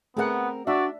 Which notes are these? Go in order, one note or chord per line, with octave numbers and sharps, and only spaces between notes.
A3 B3 C4 G#4 A#4 F#5
D4 F#4 D5 E5